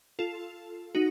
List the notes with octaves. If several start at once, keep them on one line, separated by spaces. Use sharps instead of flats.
F4 A4
D#4 F#4